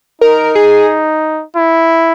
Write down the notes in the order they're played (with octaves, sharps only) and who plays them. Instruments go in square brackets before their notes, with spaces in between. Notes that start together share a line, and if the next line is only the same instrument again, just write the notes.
[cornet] D#4 [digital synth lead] A#4
[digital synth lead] G#4
[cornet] E4